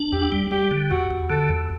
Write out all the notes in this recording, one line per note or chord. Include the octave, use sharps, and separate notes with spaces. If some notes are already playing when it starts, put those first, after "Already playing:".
Already playing: D4
E2 G4
G3
G3 G4
D3
E2 F#4
E2
D3 A4
E2